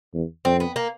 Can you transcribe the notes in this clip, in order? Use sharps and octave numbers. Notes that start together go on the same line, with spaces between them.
E2
F2 C4
B3
A#3